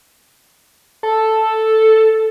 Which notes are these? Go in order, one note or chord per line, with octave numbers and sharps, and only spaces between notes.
A4